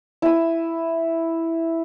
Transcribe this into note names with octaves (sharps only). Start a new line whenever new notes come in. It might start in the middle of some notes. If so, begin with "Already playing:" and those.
E4 D#6